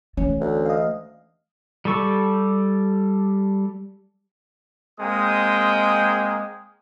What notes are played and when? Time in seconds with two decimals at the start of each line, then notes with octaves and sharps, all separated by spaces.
0.17 E3 A3 C#4
0.40 D2
0.66 D#5 F5
1.85 G3 G4 A4 C#6
4.99 G#3 A#3 C4 G5 D#6